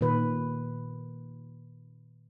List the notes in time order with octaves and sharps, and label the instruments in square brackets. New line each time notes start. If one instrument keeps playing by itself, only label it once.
[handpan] A#2 D#3 B4